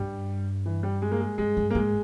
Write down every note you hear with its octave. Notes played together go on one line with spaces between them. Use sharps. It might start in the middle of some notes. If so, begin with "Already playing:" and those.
Already playing: G2 G3
E3
G3
G#3
A#3
G#3
G2 G#3
G2
A#3
G#2 G#3